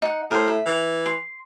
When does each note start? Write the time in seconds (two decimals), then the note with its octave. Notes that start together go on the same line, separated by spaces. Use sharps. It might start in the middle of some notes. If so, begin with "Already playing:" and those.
0.02 D#4 F#5
0.31 A2 A#4 C5
0.48 E5
0.66 E3
1.06 C6